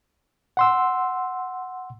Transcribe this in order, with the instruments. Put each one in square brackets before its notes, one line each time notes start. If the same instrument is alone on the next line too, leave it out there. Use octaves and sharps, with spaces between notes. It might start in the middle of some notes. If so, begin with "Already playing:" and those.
[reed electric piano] F#5 C6 E6